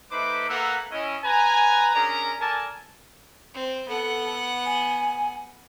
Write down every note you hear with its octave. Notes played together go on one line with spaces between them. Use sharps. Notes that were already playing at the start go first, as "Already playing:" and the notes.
A3 D#4 B4 C5 B5 D6
A#3 A4 B4 E5 F#5 A#5
C#4 E4 D#5
B4 G#5 A#5
C#4 D4 G#4 A#4 A#5
A4 A#4 D5 G#5 A5
C4
B3 A4 F#5
G#5